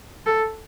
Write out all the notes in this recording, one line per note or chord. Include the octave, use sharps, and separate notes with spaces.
A4